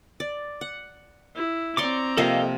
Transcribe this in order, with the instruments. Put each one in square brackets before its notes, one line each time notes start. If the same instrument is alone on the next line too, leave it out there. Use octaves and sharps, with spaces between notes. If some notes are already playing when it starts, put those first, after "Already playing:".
[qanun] D5
F#5
[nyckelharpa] E4
[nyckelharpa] C4 A#5 [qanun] C#5 D5 C6 [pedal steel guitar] D6
[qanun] C3 F3 A#3 [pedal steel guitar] A4 D#5 F5